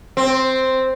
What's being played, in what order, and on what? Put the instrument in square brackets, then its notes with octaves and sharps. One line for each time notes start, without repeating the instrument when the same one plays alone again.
[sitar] C4